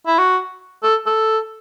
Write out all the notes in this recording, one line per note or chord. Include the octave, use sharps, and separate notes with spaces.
E4
F#4
A4
A4